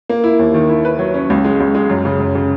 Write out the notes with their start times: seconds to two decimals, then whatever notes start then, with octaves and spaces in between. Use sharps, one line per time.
0.09 A#3
0.24 E4
0.39 D#2
0.54 D#3
0.69 E4
0.85 B4
0.99 F#3
1.14 C#4
1.30 C#2
1.44 G#3
1.60 C#2
1.75 G#3
1.89 F#2
2.05 C#3
2.21 F#2
2.35 C#3